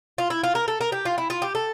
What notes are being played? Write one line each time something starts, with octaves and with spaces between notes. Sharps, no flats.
F4
E4
F4
A#4
A4
A#4
G4
F4
E4
F4
G4
A4